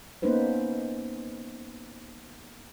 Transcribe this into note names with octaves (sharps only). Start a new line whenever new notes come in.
A#3 B3 C#4 D#4 B4 C5